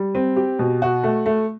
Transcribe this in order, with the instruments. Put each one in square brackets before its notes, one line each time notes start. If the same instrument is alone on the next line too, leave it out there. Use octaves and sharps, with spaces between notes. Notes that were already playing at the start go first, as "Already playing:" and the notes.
Already playing: [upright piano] G3
C4
G4
B2
F#4
A3
A3